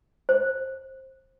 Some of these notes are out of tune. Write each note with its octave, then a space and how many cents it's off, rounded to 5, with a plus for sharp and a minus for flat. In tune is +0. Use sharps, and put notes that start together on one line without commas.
C5 +15